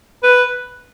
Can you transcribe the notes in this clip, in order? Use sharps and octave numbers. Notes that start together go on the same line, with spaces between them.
B4